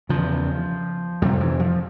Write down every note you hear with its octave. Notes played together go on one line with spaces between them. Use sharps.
E2 C#3 F3
F2 C3 G3
E3
F3